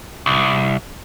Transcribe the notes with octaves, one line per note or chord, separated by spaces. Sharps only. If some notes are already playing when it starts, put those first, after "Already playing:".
C2